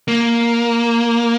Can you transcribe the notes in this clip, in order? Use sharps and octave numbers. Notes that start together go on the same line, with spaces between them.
A#3